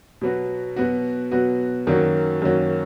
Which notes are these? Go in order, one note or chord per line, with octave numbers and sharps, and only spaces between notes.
B2 F#3 B3 F#4
B2 F#3 B3 F#4
B2 F#3 B3 F#4
F#2 D#3 A#3 C#4 F#4
F#2 D#3 A#3 C#4 F#4